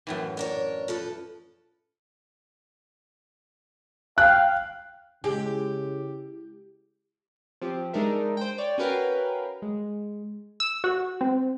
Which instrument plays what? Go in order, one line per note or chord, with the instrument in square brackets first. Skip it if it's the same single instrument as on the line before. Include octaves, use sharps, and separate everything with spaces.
[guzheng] F#2 A2 E3
[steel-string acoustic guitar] D4 A#4 C#5
F3 A4 B4
[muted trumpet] F5 [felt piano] G5 F#6
[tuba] C#3 [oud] G#3 [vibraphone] E4 [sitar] G4
[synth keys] F3 C4 G4
G#3 D4 D#4 A#4 E5
C5 G5
C#5 D5 G5
C#4 F#4 A#4 B4 F5 G5
G#3
[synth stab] E6
F#4
C4